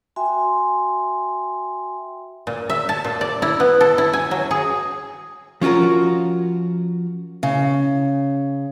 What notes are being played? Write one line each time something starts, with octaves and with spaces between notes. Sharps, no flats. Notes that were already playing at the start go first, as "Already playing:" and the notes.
F#4 E5 G5 G#5 C6
A#2
E5
A5
A#2
D5
E4
B3
A4
E4
G#5
F#3
G#4
F3 C#4 F4 F#4 A#4
C#3